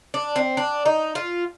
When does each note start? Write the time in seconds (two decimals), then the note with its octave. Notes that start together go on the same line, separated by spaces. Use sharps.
0.14 D4
0.36 C4
0.57 D4
0.86 D#4
1.15 F4